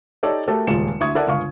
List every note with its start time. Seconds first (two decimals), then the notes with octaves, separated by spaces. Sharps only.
0.23 D#4 G4 A4 C#5 D5
0.48 A3 F#4 G4 A4 A#4
0.67 D#1 C#2 G#3 F4 C#7 E7
1.00 D2 E4 C#6 D#6 G#6
1.15 E4 A4 A#4 D5 F#5
1.27 G1 C#2 F5 C#6